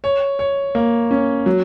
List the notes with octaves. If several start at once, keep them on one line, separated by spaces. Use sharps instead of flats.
C#5
C#5
A#3
C#4
F#3